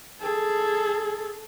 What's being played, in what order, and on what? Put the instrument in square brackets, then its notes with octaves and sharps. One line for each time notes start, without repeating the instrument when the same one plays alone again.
[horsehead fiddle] G#4 A4